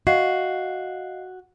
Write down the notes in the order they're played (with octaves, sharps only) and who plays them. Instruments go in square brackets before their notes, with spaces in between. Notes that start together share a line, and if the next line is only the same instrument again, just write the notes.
[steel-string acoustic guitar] F#4 [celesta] D#5 F5 C7